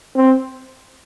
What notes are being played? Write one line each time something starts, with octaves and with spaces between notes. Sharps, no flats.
C4